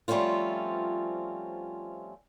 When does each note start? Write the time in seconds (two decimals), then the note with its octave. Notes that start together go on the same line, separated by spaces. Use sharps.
0.08 F3 G3 A3 C4 C#4 F4